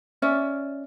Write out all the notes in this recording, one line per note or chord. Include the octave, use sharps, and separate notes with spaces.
C#4 D5 E5